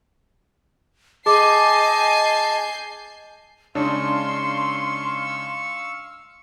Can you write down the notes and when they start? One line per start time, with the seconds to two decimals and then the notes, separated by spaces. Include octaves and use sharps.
1.26 G#4 D#5 G#5 A5 D6 G6 C7
3.75 C#3 G#3 D4 D#4 F5 C6 C#6 E6